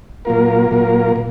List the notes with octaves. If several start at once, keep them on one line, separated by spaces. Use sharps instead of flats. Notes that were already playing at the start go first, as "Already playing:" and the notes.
A#2 F#3 A#3 F4 A#4
A#2 F#3 A#3 F4 A#4
A#2